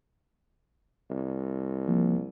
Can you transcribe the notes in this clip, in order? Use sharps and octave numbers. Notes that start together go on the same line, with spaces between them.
C2
F3 A#3